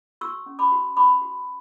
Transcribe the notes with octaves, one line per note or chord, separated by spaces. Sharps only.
F#4 C#6 E6
C#4
B5 D6
F#4
F#4 B5 D6
F#4